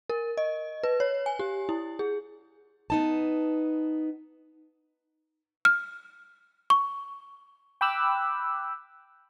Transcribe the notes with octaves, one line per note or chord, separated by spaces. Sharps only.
A#4
D#5
B4
C#5
G#5
G4
E4
G#4
B3 D#4 A5
F6
C#6
G5 B5 D6 E6 F#6